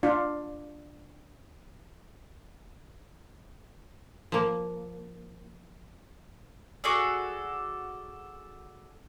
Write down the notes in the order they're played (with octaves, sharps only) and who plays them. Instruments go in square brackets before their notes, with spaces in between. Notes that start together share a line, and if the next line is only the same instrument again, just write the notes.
[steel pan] D4 F4
[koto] F3 A#3
[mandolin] F#4 G#4 A4 D5